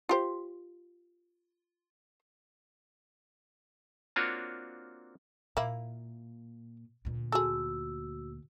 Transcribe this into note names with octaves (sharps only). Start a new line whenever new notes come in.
F4 G4 C5
A#3 C4 D4 F4 F#4 C#5
A#2 A#3 E4
D2 A#2
F#4 G#4 A4 E6